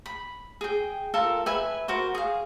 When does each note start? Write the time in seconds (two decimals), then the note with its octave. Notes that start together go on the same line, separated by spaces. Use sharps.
0.06 B5
0.61 G#4 G5
1.14 F4 A4 A#4 A5
1.46 B4 E5 G#5
1.88 F#4 A#4 C5
2.15 G#4 F5